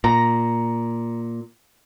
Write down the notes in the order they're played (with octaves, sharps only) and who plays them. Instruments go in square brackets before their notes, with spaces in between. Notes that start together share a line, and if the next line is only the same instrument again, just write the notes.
[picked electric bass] A#2 [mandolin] A#5